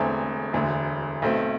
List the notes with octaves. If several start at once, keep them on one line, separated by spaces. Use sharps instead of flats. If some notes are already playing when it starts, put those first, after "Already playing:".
Already playing: E1 E2 D3 A3 C4
E1 D2 D3
B1 B2 A3 C4